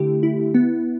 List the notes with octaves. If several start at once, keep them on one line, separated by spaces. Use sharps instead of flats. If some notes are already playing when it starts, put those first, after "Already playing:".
Already playing: D3 A3 E4 G4
E4
B3